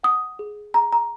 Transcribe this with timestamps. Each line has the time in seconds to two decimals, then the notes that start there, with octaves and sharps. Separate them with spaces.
0.03 F#5 D#6
0.39 G#4
0.74 G#4 A#5
0.93 A#5